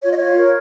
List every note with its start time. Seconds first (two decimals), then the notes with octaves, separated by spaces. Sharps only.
0.03 F4 C#5
0.11 D#5
0.18 F4 C#5
0.36 A#4